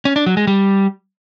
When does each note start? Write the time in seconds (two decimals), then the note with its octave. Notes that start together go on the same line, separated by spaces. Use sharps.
0.05 C#4
0.16 D4
0.26 F#3
0.37 G#3
0.47 G3